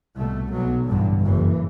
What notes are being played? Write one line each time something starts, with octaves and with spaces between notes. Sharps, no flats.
C2 B2 A3
B1 B2 F#3
A1 G2 D3
F#1 F#2 E3